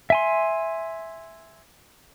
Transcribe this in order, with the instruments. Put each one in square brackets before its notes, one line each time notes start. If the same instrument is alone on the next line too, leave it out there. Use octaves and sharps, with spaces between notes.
[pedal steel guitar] E5 G#5 C6